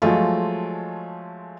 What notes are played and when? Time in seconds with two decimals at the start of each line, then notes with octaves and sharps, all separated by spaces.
0.02 F3 F#3 G#3 A3 F4